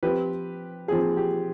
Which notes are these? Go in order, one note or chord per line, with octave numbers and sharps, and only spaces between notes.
F3 C4 F4 G4 B4
F3 C4 F4 G#4
G4